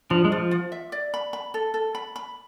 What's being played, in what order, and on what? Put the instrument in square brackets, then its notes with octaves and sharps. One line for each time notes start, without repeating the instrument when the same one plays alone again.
[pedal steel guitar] F3 [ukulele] D4
[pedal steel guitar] G#3
[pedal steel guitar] F3 [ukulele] F4
[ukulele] F4
E5
D5
B5
B5
A4
A4
B5
B5